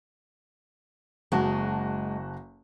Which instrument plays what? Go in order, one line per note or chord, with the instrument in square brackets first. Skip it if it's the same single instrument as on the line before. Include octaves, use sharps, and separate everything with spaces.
[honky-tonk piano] F#1 F#4 A5 [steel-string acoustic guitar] G#3